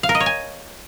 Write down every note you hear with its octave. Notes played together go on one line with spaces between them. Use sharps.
F5
A#4
D#5
C#5
G#5